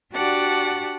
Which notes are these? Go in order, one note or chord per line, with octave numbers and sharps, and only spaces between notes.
D4 F#4 G4 D5 F#5 A5